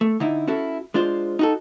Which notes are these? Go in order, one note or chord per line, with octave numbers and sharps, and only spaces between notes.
A3
D3 D#4 E4
C#4 E4 F#4 A4
G#3 D4 F4 C5
D#4 F#4 A4